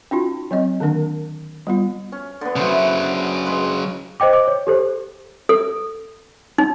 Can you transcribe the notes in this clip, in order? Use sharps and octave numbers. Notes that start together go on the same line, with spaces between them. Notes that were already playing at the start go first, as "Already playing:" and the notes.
C#4 D#4 F4 F#4
F#3 C4 D#5
D3 D#3 A#3 D4 A#4
G3 B3 F4
C#4
D3 B3
C#3 F#3 B4 C5 E5
G#3 B4
C5 D#5 G5 D6
D6
C#5
G4 A4 C5
A4
D#4